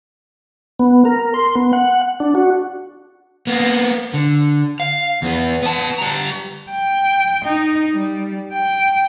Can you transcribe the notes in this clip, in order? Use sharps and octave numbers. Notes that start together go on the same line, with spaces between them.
B3
A#4
C6
B3
F#5
D4
F#4
A#3 B3
D3
F5
E2 B3
B3 A5
G3 A#5
G5
D#4
G3
G5